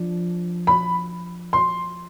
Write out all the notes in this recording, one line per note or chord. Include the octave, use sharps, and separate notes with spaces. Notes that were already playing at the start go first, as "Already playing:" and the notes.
Already playing: F3 D4
B5
C6